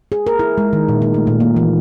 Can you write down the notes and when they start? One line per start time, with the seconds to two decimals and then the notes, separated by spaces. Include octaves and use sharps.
0.12 G#4
0.27 A#4
0.39 E4
0.58 G#3
0.73 D#3
0.89 A#2
1.02 D#4
1.14 A3
1.27 A#2
1.40 A#3
1.56 E3